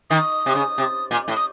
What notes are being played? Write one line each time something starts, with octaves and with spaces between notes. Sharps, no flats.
D#3 D#6
C3
C#3
C3
A#2
A2
D#6